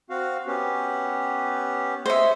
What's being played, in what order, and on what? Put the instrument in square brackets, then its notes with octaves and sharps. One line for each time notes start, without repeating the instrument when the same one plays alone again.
[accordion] C4 F#4 F5
B3 C#4 G4
[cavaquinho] C5 E5 [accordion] C#5 D#5